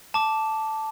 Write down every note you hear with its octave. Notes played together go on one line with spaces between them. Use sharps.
A5 D6